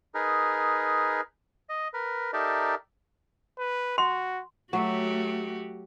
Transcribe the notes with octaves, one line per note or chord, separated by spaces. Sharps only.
D#4 G#4 A#4 B4
D#5
A#4 B4
D#4 G4 A4 A#4 D5 E5
B4
F#4 C6
F#3 A3 F#4 G4